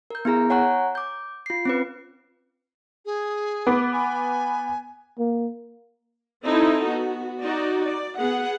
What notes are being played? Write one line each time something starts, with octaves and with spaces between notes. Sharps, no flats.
A#4 G6
B3 E4 G#4 A#5
C#5 F#5 G#5 A#5 C#6 F#6
D6 G6
F4 C7
C4 C#4 B4
G#4
B3 D6
G#5
A#3
C4 D#4 E4 A4
B3 F#4
D#4 F#4 D5
D5
B3 G#4 F#5